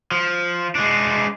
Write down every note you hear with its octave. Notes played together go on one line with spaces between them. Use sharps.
F3
G#3 D4